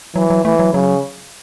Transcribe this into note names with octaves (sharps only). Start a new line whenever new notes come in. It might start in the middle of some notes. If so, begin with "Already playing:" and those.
E3 F#3
F#3
E3 A3
F#3
C#3 F#3